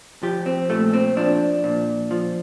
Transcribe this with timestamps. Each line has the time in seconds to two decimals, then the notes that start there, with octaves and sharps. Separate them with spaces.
0.23 F3 G4
0.46 C4
0.70 A#2 A3
0.93 C4
1.17 F3 D4
1.64 A#2
2.11 F3